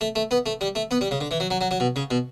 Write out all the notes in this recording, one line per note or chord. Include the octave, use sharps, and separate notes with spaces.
A3
A3
B3
A3
G3
A3
B3
G3
C#3
D3
E3
F#3
F#3
F#3
F#3
B2
C#3
B2